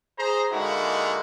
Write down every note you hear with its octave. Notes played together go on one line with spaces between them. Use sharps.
G#4 C5 A#5
D3 G#3 A#3 D#4 E4 F#4